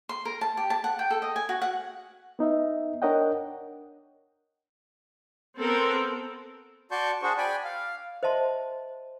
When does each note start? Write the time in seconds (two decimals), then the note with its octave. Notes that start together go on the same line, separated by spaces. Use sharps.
0.09 C6
0.25 A#4
0.41 A5
0.57 G4
0.70 A5
0.84 F#5
0.99 G5
1.10 A4
1.22 D#5
1.36 G#5
1.49 F#4
1.61 F#5
2.39 B3 D#4 D#5 E5
3.02 D4 A#4 C#5 D#5 F#5 G5
5.59 B3 C4 A4 A#4
6.91 F#4 D5 A5 C6 C#6 G6
7.22 D4 F#4 G#4 C5 C#6
7.38 D5 G5 G#5 B5
7.64 F5
8.23 C5 D#5 E5 A5 C6